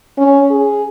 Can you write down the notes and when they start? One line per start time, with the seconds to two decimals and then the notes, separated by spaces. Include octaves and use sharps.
0.18 C#4
0.51 G#4